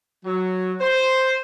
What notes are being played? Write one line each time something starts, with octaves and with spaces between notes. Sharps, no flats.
F#3
C5